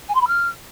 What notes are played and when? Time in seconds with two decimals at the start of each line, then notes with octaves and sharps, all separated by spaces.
0.08 G#5
0.15 C6
0.21 B5
0.27 F6